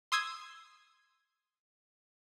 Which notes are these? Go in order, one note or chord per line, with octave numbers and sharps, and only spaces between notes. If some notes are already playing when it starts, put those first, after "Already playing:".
C6 D#6 E6 G#6 C7